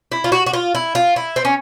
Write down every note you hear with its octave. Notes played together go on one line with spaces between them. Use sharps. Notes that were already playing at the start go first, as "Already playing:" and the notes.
E4
F4
F#4
F#4
F4
E4
F4
E4
C4
C#4